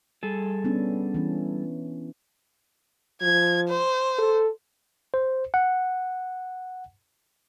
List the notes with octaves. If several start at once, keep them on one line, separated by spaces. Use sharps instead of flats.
G3 G#4 A4
B3 C#4 D4
E3 C#4
F3 G#6
C5
A4
C5
F#5